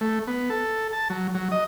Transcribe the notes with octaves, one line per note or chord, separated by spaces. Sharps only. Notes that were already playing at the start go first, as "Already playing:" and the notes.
A3
B3
A4
A5
F#3
F#3
D#5